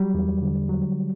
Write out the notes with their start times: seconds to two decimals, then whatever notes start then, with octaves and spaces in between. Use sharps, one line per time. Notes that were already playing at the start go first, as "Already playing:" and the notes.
Already playing: F#3 G3
0.14 E2
0.42 D3
0.69 F#3